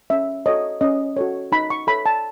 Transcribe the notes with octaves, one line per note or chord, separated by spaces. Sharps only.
C#4 E5
F#4 A4 C#5 D#5
C#4 D#5
F#4 A4 C#5
D#4 B5
C#6
A4 C#5 B5
A5